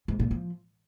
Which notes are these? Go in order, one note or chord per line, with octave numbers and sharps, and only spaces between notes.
G#2
A#2
F3